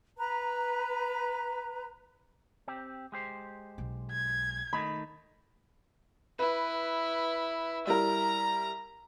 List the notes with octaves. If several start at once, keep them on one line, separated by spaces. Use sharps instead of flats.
B4 A#5
C4 G4
G#3 G4 C5
B1
G#6
D#3 A3 D#4 B5
E4 B4
G3 E4 A#4 A#5